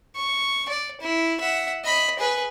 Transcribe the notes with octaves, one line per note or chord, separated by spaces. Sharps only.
C#6
D5
E4
E5 F#5
D#5 B5
G#4 B4